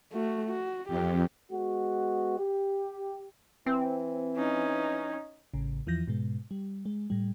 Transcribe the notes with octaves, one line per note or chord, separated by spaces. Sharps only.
A3 F#4
F#4
F2 G4
G#3 B3 F#4
G4
E3 C4
C#4 D#4
A1 A2 C#3
E2 E3 F3 G6 A#6
G#2 B2 G#3
G3
G#3
A2 G3